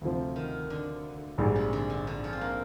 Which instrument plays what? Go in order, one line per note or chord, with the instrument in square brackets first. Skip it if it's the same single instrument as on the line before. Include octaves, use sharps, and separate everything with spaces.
[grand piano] D2 C3 F3
[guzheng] D#3
D3
[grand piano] A#1 G#2 G3 D4 G#4
[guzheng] C3
D3
D3
D3
F3
C4
A#3